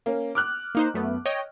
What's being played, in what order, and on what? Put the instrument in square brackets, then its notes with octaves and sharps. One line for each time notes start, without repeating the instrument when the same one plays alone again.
[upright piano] A#3 C#4
D6 F6 F#6
[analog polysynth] A#3 D#4 C5
F#2 A3 B3
C#5 D#5 G5